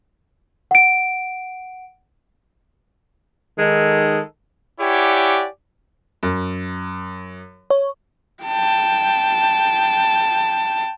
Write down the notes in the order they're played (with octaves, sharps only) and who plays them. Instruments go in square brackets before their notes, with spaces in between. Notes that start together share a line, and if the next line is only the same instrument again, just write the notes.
[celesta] F#5 D7
[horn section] D#3 G#3 D#4 A4
[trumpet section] E4 G4 C#5 D5 F#5 G#5
[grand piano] F#2
[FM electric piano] C#5
[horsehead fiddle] G5 A5